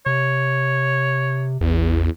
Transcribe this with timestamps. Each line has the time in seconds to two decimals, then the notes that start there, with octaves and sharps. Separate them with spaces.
0.06 C3 C#5
1.61 A1 E2